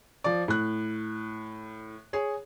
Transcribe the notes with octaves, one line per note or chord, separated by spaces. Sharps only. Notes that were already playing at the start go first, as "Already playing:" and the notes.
F3 D5
A2 F#6
G#4 C#5